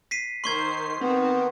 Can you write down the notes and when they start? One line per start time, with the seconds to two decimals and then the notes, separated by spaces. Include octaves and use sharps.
0.11 B6 C7 D#7
0.44 D#3 C5 C6 C#6 G#6 C7
1.01 D#3 B3 C4